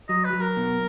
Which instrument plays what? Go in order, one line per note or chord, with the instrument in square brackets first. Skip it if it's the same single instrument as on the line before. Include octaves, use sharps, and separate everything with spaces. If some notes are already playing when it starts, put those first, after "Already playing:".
[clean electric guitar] F#3 [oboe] D#5
[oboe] B4
[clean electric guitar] F#3
[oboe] A#4
[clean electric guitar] B2